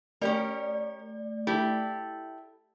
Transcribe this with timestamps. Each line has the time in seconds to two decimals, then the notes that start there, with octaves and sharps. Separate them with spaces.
0.21 A3 C#4 G4 A#4 D5
1.47 E4 G4 A4